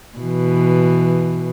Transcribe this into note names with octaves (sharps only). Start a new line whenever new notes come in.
B2 E3